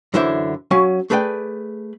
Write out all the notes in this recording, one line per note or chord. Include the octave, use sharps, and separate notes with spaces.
F#2 D3 E3 E4 C5 E5
F#3 C#4 F5 G#5
A3 G#4 B4 D5 E5 G5